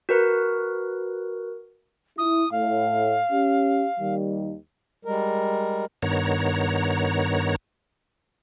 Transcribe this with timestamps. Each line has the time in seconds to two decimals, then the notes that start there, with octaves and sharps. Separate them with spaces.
0.09 F#4 A#4 B4
2.18 E4 D#6
2.52 A2 F5
3.30 C#4 G4
4.00 D#2 D#3 G3
5.05 G3 G#3 A#4
6.02 G2 D#3 B3 C#5 A#5